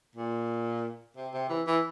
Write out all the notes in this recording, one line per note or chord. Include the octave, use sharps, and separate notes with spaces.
A#2
C3
C3
E3
E3